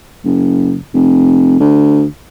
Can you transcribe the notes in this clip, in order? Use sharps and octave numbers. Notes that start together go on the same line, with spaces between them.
F#1
F1
D2